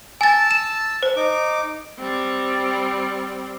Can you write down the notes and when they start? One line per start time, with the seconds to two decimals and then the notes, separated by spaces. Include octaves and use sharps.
0.21 G#5 A5 E6 A6
0.51 E7
1.03 C5
1.16 D#4 D6
1.99 G3 C4